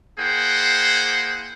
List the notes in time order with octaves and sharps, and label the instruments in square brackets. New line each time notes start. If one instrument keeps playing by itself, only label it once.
[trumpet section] A#3 E4 G#4 C5 F#5 G5